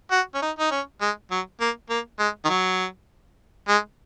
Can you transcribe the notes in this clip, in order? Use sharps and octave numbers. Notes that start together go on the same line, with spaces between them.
F#4
C#4
D#4
D#4
C#4
G#3
F#3
A#3
A#3
G#3
D#3
F#3
G#3